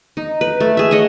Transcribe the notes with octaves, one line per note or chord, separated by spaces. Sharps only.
D#4
B4
A3
G#4 E5
C#5 D#5 F#5 G#5